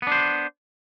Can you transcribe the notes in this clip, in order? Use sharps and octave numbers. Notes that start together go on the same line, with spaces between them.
B3 D4 C5